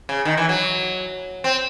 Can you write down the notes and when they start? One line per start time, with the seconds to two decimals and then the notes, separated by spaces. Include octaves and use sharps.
0.09 C#3
0.25 D#3
0.37 E3
0.49 F#3
1.44 C4